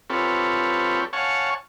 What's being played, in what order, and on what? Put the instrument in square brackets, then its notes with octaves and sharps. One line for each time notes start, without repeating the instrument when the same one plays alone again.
[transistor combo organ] C4 F4 G4 A4 B4 C#5
C#5 F5 F#5 G#5 A5 C#6